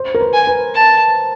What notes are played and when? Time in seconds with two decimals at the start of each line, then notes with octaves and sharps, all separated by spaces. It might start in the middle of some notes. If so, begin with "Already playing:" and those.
Already playing: C5
0.14 A#4
0.21 B4
0.33 G#5
0.47 B4
0.74 A5